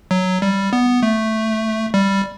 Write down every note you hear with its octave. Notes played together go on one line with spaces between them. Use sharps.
F#3
G3
B3
A3
G3